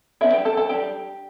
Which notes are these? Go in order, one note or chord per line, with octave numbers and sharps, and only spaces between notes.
G3 B3 D4 E4 E5
G4 G5
A4 A5
A4 A5
G3 D4 G4 G5